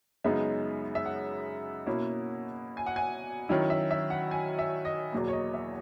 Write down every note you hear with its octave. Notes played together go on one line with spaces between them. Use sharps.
F#2 C#3 G#3 B3 D#4 E5
E5
F#5
B2 A#3 C#4 E4
G#5
F#5
G#5
D#3 F#3 C#4 E4
E5
E5
F#5
G#5
E5
D#5
E2 B2 F#3 A#3
C#5
D#5
E5